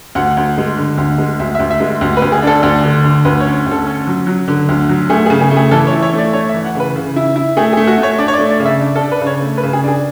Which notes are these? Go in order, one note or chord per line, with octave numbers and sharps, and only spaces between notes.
D2 F#5
D2
G#3
D3
D2
G#3
D2 E5
E5
D2
E5
G#3
D2
B4
D2
G#4
D4 A4
D2
D3
D3
D2 B4
C#5
C#4
D2
A4
C#4
F#3
F#3
D3
D2
F#3
A3 G#4
G#4
C#3
G#4
A3
G#4
E3 A4
C#5
E4
C#5
A3 D5
A3 C#5
E5
E3
F#5
C#3
B4
C#3
E4
E4
A3 G#4
G#4
A3
F#4
A3
C#5
D4 D5
C#5
D5
A3
D5
C#3
E5
D4
A4
D4
B4
C#3
C#5
A3
B4
C#3
G#4
D4 G#4